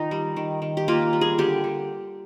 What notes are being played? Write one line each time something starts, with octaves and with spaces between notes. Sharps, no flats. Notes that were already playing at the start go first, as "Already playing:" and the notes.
Already playing: D#3 D#4 F4
G3
D#3
D#3
G4
A#3 F4
G3
G#4
D3 G4
D3